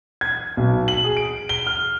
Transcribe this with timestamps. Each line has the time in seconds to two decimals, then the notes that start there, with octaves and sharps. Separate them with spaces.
0.21 G#6
0.57 B1
0.88 F#7
1.04 G#4
1.17 D7
1.49 G7
1.67 F6